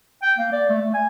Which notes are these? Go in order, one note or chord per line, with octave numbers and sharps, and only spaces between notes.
G5
A#3
D5
A3
A3
G#5